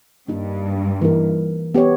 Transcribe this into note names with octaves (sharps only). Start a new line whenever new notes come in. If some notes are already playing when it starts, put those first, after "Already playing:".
G2 A#3 D#4 G4
E3 A#3 D#4 A#4
B3 G4 C#5